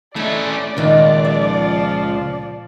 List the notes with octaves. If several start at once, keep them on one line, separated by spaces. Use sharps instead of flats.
A3 C#4 E4 G#4 D5
C#2 A#2 D#3 A3
F3 E5